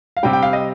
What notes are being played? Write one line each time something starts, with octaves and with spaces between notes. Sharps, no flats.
F5
C3 G3 G5
G5
F5
D#5